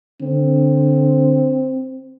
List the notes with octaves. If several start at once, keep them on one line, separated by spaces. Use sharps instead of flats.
D3 C4